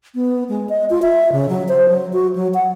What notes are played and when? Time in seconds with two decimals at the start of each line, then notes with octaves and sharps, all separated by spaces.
0.15 B3
0.49 G#3
0.69 D#5
0.90 F4
1.02 E5
1.32 C#3
1.49 F#3
1.69 C5
1.88 F#3
2.13 F#4
2.36 F#3
2.54 F#5